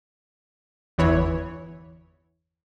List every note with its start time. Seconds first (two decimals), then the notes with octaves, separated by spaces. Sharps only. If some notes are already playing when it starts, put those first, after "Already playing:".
0.98 G1 E2 E3 E4 C#5